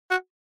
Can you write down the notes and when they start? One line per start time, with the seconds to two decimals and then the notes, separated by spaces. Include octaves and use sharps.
0.11 F#4